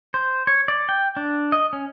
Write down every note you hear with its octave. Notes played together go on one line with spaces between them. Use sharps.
C5
C#5
D5
G5
D4
D#5
C#4